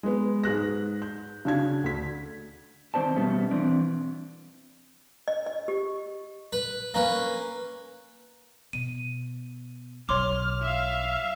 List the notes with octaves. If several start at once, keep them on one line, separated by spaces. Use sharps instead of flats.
G#3 B3
G#2 G#4 F#6 A#6
G6
C#3 D4 F#4 G#6
D2 B6
D#3 C4 C5 D5 A5
B2 G3 A3 B3 C#4
E3 C4 D4 D5
D#5
D#5
G4
B4
A#3 C#4 B4
B2 D#7
B1 F#3 C#5 C6 D6 F6
E5 F5